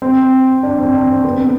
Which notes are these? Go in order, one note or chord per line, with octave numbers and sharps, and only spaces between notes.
C4
D4
C4
D4
C4
B3